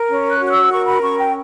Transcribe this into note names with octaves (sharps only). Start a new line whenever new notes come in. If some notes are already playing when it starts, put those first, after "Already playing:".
Already playing: A#4
C#4
F#6
F#4 F#6
E6
A#4 C#6
B5
C#4 C#6
G5